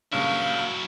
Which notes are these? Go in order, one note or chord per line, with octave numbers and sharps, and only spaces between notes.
G2 A#2 C#3 F#3 E4 F5